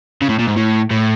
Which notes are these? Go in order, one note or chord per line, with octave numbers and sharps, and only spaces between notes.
C#3
A2
A#2
G#2
A2
A2